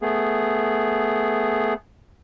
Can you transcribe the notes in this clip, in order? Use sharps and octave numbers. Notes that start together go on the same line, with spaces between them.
A3 B3 G#4